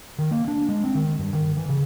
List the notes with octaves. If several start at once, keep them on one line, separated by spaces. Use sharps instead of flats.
D#3
A#3
D4
G#3
C4
D#3
G2
D#3
E3
C#3